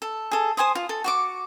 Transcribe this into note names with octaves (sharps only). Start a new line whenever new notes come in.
A4
G#4 A4
C5 G#5 C6 D#6
F4
A4
F#4 C#6 D6